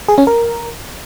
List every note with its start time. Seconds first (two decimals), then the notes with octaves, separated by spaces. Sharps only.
0.09 G#4
0.18 C#4
0.27 A#4